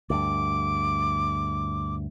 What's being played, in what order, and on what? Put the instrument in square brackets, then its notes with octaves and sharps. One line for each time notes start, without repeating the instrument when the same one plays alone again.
[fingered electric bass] D2 G2 [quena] D6